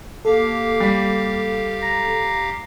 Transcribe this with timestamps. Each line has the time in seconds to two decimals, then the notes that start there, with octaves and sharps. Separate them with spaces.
0.25 A#3 G4 A4 F5
0.80 G3 B6
1.83 A#5